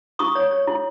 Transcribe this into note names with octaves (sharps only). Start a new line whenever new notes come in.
E4 C#6 D#6
C#5
C#5
E4